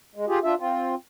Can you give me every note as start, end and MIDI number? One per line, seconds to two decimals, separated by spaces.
0.16 0.25 56
0.28 0.39 65
0.28 0.39 67
0.28 0.39 68
0.44 0.55 62
0.44 0.55 65
0.44 0.55 76
0.59 0.95 60
0.59 0.95 65